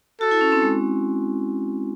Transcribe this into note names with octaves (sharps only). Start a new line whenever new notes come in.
F#4 A4
E4
C#4
C4
G#3